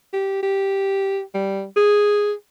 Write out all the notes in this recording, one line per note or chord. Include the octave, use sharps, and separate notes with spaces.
G4
G4
G3
G#4